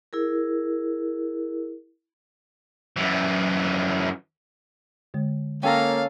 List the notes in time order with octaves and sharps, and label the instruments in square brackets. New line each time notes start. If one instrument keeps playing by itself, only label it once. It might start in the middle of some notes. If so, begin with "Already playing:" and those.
[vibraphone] E4 G#4 A#4
[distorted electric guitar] F#2 E3
[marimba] D3 G#3
[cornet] A#3 [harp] C#4 A4 A#5 [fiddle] F5 [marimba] G5